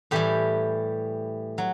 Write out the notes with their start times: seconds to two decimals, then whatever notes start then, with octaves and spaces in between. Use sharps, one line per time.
0.11 A2 E3 G3 G4
1.58 F#3